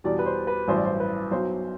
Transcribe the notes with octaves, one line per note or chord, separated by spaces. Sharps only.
E2 B2 G3 D5
B4
C5
B4
A1 G2 F#3 C5
D5
C5
B4
B1 B2 F#3 C5